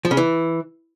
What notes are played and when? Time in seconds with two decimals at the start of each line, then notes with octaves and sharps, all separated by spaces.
0.05 F3
0.11 C#3
0.17 E3